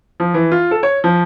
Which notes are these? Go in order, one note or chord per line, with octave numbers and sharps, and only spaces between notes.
F3
E3
F4
A4
C#5
F3